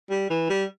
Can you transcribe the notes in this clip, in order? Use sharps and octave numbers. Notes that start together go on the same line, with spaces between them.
G3
E3
G3